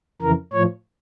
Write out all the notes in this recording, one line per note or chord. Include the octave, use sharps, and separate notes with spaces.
F2 C#3 E3 A#4
A2 F3 C#5